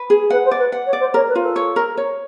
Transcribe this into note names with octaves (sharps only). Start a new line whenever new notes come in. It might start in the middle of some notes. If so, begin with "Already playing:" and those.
Already playing: B4
G#4
B4 F#5
C5
D5
B4
F#5
C#5
D5
C5
A#4 C#5
B4
F4
A4
C#5
A#4
C#5